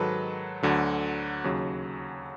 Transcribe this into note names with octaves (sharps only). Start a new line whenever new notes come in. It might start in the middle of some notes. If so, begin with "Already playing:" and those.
Already playing: G#2 D#3 F#3 A4 B4
D2 D3 F#3
D#2 C#3 F#3